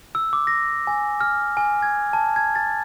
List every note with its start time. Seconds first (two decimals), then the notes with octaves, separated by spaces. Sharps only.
0.15 E6
0.33 D6
0.47 A#6
0.87 G#5
1.21 F6
1.57 G#5
1.82 G#6
2.13 A5
2.36 G#6
2.55 A6